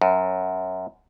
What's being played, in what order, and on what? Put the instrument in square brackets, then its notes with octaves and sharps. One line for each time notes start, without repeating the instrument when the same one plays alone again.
[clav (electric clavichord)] F#2